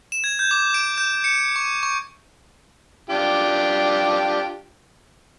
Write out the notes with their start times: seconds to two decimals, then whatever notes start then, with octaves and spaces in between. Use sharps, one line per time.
0.12 E7
0.24 G#6
0.39 G6
0.51 D6
0.74 D7
0.98 G6
1.24 C#7
1.56 C#6
1.83 C#6
3.10 D4 F4 G4